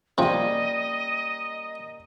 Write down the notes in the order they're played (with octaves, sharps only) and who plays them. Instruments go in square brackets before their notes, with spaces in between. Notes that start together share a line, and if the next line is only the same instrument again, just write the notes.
[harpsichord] C3 F3 [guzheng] G3 C#4 [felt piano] A#3 G5 [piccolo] D#5